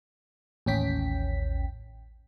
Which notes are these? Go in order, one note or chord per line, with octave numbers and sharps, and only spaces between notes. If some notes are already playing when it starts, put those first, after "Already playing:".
A1 D#2 C#4 G5 B6